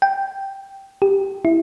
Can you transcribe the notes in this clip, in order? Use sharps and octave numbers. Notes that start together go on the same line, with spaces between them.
G5
G4
E4